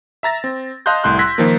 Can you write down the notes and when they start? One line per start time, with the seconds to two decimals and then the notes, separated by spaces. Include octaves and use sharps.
0.23 E5 A#5 A6 A#6
0.44 C4
0.86 D#5 F5 A5 C6 F#6 G6
1.04 C2 A2 C6 F#6
1.18 C6 E6 F#6 G#6 A#6 B6
1.38 D#3 F3 A#3